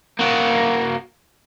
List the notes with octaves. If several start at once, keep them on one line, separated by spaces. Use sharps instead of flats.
A#3 F#4